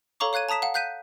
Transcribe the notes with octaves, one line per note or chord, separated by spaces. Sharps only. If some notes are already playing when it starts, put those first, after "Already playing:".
A4 C#5 F5 A#5 C#6 D6
C#5 F5 F#6 G#6 D#7
A5 A#5 D#6 B6 E7
F5 F#5
F5 F#6 G6 B6 D#7